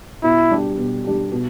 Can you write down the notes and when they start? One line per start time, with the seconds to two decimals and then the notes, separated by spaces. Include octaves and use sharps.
0.23 B2 E4
0.51 G3 D4 G4
0.78 B2
1.04 G3 D4 G4
1.32 B2